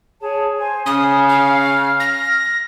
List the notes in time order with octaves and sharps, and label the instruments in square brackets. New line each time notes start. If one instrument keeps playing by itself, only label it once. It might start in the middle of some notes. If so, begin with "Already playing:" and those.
[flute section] G#4 C#5 A5
C5 G#5
[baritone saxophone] C#3 [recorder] D#6 [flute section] F6
[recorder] F5
A#6